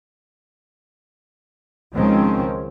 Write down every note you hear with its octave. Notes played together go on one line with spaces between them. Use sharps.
C#2 D#3 F3 G#3 C4 C#4